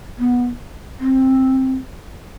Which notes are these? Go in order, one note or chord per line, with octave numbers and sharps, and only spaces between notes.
B3
C4